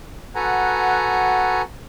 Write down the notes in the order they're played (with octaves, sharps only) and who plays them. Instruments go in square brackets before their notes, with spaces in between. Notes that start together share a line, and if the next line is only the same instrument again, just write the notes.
[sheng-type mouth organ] F#4 A4 B4 F#5 G#5 A#5